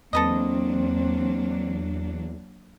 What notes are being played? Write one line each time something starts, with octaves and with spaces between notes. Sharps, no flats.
E2 F#3 A#3 C4 D4 A4 B4 D#5